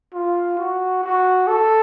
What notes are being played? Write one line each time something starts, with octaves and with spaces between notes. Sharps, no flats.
F4
F#4
F#4
A4